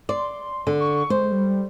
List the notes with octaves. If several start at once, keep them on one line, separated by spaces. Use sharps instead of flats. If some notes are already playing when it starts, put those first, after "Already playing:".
D5 C6
D3
C#6
G#3 C5
G3